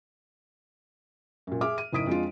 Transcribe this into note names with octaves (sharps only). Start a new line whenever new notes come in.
F#2 A#2
G#4 E5 D6 F6
D#7
F#1 A2 D#4 D#6 B6 D7
F2 G#3 D4 F4